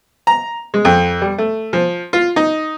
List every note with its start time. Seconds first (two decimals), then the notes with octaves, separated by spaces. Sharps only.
0.27 A#5
0.74 G#3
0.85 F2
1.22 G3
1.38 A3
1.73 F3
2.13 F4
2.36 D#4